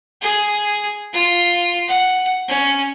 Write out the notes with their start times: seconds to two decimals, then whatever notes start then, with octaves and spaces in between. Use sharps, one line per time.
0.22 G#4
1.13 F4
1.88 F#5
2.48 C#4